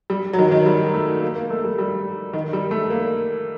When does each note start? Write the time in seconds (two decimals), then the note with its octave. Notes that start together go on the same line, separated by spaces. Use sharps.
0.10 G3
0.33 F#3
0.39 D#3
0.52 D#3
0.66 G3
0.94 A3
1.21 A#3
1.36 A#3
1.50 A3
1.64 G3
1.78 G3
2.33 D#3
2.53 G3
2.71 A3
2.90 A#3